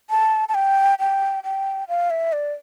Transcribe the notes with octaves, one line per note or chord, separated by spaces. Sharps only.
A5
A5
G5
G5
G5
F5
E5
D5